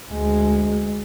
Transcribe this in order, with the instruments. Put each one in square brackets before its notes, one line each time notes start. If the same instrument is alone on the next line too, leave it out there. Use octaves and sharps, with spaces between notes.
[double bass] D2 G#3